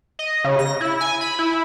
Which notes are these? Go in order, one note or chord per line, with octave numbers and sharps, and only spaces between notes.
D#5
C#3
A#6
E4
G#5
B5
E4